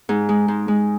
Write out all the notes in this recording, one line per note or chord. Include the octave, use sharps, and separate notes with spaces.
G#2
G#3
G#2
G#3